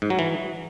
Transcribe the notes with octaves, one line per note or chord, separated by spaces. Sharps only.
G#2
F#3
E3